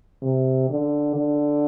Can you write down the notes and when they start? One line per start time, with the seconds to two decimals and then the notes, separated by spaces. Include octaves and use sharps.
0.23 C3
0.70 D3
1.16 D3